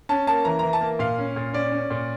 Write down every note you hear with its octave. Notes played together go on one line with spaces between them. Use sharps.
C#4 A5
A#3 A5
E3 A#5
E3 A#5
A5
A#3
A#2 F5
C#4
A#2
C#4 D5
C#4
A#2